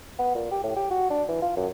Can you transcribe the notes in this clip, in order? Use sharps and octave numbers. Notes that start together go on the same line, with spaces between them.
B3
A#2
G4
A2
G4
F#4
D4
E3
F4
F#2